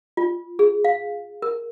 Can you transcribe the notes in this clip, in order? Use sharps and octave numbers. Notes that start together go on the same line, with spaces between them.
F4
G#4
F5
A#4